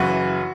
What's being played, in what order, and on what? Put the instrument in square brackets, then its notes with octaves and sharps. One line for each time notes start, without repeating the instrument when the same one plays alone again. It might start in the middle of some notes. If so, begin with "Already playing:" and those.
Already playing: [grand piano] F#1 F#2 C#3 E3 F#4